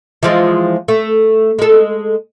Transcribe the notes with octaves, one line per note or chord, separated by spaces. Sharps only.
E3 F3 G#3
A3
G#3 A4